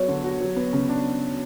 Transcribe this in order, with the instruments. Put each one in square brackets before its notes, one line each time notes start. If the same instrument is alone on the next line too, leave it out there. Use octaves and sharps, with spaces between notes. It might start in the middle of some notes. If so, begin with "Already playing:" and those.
Already playing: [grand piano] F#3 B3 [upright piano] C#5
[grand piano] D3
F#4
F#3
B3
C#3
D4